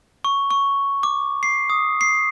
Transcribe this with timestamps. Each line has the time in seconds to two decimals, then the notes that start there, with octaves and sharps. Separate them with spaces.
0.24 C#6
0.51 C#6
1.03 D6
1.43 C7
1.70 D#6
2.01 C7